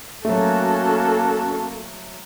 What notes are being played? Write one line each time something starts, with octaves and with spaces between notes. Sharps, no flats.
F#3 A3 A#3 C#4 F#4 A4 A5